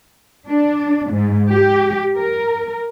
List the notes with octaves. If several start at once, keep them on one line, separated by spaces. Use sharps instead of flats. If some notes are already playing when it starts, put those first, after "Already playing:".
D4
G#2
G4
A#4